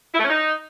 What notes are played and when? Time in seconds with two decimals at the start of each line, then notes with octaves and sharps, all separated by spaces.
0.14 E4
0.19 A3
0.24 C#4
0.30 D#4